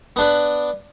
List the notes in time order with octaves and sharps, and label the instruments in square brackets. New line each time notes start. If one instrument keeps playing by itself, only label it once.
[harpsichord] B3 D4 B4